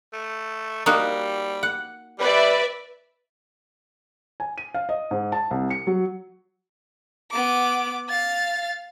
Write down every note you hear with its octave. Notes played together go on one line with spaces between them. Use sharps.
A3
G3 A#3 D#4 F#4
F#5
G3 B4 D5 E5
G#5
D#7
F5
D#5
G#2
A5
C2
C#7
F#3
B3 D6
F5 A6